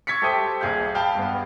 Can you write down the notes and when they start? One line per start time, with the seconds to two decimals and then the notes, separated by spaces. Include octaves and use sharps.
0.07 C#6 E6 G#6 A6 B6 C#7
0.22 G4 A4 C5 E5 G5 D#6
0.61 D#1 A#1 G#4 F5 G6
0.95 F5 G5 A5 B5
1.15 G2 B3